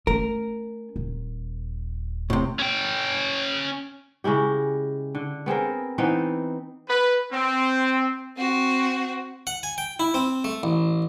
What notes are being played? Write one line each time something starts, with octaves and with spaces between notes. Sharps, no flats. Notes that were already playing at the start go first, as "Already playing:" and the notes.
A3 C#4 A#4
D#1
A2 C3
C#4 G5
C#3 G#3 E4 G4
D3
B3 C4 G#4 A#4
E3 B3 C4 D#4
B4
C4
C4 F#4
F#5
G#5
G5
E4
C4
A3
A1